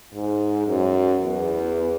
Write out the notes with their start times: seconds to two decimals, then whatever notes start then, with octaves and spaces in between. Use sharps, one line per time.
0.14 G#2
0.68 F#2
1.22 E2